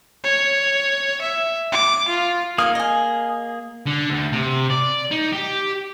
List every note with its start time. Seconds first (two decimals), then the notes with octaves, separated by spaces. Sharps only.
0.24 C#5
1.22 E5
1.73 D6
2.09 F4
2.58 A#3 D#4 G#4 A#4 F5 D#6
2.75 D#5 G#5
3.86 D3
4.10 D2
4.32 C3
4.70 D5
5.11 D#4
5.33 G4